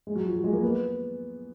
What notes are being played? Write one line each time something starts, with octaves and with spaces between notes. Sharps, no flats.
G#3
F#3
F3
F#3
G#3
A#3
B3